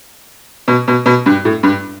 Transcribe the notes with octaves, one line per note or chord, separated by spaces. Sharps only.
B2
B2
B2
G2
A2
G2